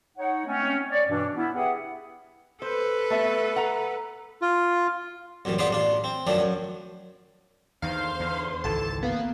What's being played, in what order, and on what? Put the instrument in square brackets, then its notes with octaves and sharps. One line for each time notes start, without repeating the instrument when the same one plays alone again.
[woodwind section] D#4 C#5 F#5
G#3 A3 C4 C#4
C#5 D5
G2 B2 E3 D4
B3 C#4 E4
G4 G#4 B4 E5 F#5
[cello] A4 B4 [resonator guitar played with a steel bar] C5
[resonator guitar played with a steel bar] A3 B3 E5
F#5 A#5
[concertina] F4
[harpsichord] C2 F#2 A2 E3
B3 F4 G#4 B4 C5 D5
A1 D4 F4
C4
F#2 D#3 F3 A3 D4
F#2
[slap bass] E2 D#3 [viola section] D3 C5 C6 [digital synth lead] F5
[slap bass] E2
[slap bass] G#1 C#2 E3 [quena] A4 [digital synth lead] A5
[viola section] A#3 [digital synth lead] B3 [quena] F5